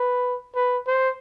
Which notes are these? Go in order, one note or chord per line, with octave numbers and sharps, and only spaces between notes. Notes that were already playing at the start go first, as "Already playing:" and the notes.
Already playing: B4
B4
C5